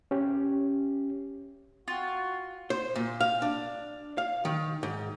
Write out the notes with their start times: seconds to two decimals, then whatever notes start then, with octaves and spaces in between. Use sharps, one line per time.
0.11 C#4 G4
1.88 F4 F#4
2.70 C5
2.96 A#2
3.21 F5
3.42 D4
4.18 F5
4.45 D#3
4.83 G#2